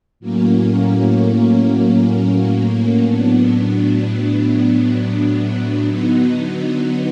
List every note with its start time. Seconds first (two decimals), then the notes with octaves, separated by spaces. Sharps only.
0.20 A2 F#3 A#3 C#4
3.02 A2 F#3 B3 D4
5.86 D3 F#3 B3 D#4